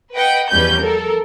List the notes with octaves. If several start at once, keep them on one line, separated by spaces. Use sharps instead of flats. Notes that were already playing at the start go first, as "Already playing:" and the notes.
B4 D#5 F#5 G5
E2 F3 G3 C#4 B4 G6
A4 A#4